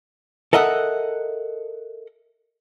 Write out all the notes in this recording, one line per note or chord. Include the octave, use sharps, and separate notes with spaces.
A4 A#4 D#5 E5 F#5